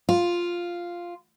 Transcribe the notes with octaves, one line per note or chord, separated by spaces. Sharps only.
F4